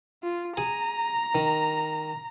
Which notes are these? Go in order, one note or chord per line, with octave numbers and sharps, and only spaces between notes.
F4
G#4 A#5
D#3